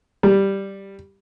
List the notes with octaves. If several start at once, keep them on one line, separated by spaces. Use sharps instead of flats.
G3